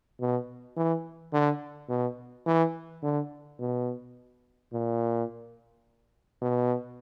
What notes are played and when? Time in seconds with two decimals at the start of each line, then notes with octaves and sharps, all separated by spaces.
0.21 B2
0.77 E3
1.33 D3
1.89 B2
2.46 E3
3.03 D3
3.59 B2
4.73 A#2
6.42 B2